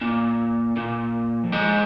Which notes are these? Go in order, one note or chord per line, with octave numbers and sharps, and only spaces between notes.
A#2
A#2
F2
G#2